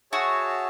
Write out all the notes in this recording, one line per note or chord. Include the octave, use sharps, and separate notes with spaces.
F#4 G#4 C#5 E5 A5